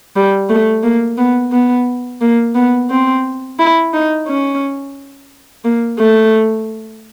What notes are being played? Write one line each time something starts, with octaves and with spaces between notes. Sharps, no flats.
G3
A3
A#3
B3
B3
A#3
B3
C4
E4
D#4
C#4
A#3
A3